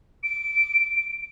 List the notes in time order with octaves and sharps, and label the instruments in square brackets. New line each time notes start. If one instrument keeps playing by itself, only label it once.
[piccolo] D7